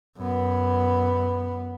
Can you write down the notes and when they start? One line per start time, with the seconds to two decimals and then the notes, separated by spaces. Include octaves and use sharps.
0.18 F#2 B3